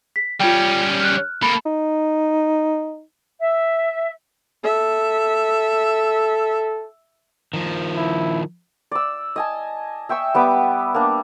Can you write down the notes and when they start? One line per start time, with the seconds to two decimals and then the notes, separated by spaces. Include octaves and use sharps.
0.16 B6
0.40 G3 C#4 F4 G5
1.00 F6 F#6
1.42 A#3 A4 B5
1.66 D#4
3.40 E5
4.65 A4 E5
7.53 D#3 F3
7.96 E4
8.91 D5 E6
9.36 D#5 G#5 A5
10.09 E5 G5 C#6 E6
10.34 G3 B3 D5 D6
10.94 A#3 D4